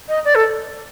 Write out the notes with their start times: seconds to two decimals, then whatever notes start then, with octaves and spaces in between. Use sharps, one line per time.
0.08 D#5
0.25 D5
0.35 A4